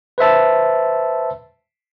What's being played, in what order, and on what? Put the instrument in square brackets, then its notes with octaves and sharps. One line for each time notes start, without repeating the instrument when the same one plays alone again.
[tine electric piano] B4 C5 E5 A5